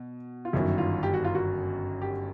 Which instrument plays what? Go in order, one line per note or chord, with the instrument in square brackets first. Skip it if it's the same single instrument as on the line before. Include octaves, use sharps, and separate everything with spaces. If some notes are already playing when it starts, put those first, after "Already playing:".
Already playing: [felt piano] B2
[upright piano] F4
[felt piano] G1 F#2 D#3 F#3 [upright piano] E4
[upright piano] F4
G4
F#4
F4
F#4
G4